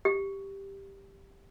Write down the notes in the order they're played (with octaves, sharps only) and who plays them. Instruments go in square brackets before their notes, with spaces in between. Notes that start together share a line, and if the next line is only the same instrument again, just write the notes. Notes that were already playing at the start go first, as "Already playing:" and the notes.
[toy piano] G4